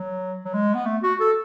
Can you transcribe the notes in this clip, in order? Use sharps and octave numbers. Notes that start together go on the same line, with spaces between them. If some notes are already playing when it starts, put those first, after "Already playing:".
Already playing: F#3
F#3
G#3
B3
A3
F#4
A4